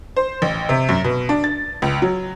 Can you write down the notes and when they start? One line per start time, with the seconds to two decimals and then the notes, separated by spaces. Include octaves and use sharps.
0.17 C5
0.42 A1
0.69 C3
0.89 F#2
1.04 B2
1.29 D4
1.44 A6
1.82 C#2
2.02 F#3